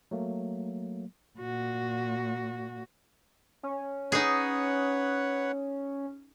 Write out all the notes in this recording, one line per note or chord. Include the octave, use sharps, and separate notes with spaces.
F#3 A3 A#3
A#2 F#4
C#4
D#4 G#4 B4 C#5 F#5